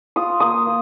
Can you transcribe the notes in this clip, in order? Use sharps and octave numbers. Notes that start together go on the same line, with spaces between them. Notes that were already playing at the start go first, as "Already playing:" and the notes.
F4 D#6
A#3 D#6
A#3